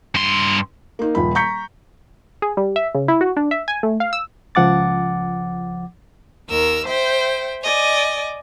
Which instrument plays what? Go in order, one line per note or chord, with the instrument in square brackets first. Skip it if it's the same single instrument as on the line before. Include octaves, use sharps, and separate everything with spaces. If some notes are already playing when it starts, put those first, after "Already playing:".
[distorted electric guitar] G2 C6
[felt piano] A#3 D#4
D#1 F3 B5
A#5 C#6 G6 B6 C#7
[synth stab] G#4
G3
E5
C#3
E4
F#4
D4
E5
G#5
A3
F5
E6
[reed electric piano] C#2 F3 F#5 D6 A6
[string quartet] D#2 A#4 E6
C5 E5 G5
D5 D#5 G#5